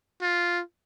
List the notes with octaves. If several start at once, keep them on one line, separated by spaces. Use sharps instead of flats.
F4